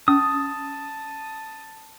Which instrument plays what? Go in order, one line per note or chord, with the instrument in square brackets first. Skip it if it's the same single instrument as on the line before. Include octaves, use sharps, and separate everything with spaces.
[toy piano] C#4 [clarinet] A5 [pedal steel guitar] D#6